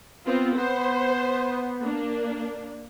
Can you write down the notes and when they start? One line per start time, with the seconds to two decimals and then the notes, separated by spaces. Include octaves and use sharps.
0.26 B3 C4 F4
0.57 B3 C5
1.80 A#3 D4